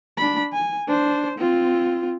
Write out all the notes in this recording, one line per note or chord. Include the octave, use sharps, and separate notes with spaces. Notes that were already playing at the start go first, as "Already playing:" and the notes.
D4 B5
G#5
D4 C5
C4 F4